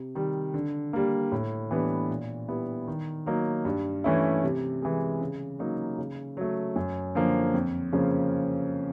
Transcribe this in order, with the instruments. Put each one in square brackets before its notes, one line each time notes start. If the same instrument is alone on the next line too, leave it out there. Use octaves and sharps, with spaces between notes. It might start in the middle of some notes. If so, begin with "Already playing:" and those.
Already playing: [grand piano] C3
D#3 G3
D3
G3 A#3
A2
E3 G3 B3 D4
A#2
G3 B3 E4
D#3
F#3 A#3 D#4
G2
E3 A3 C#4 E4
C3
E3 G#3
C#3
F#3 A#3 D#4
C#3
F#3 A3
F#2
D3 F3 A#3
F2
C#3 F3 A#3 C#4